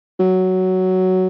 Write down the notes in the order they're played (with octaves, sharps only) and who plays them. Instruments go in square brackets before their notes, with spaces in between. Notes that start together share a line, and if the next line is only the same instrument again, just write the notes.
[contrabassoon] F#3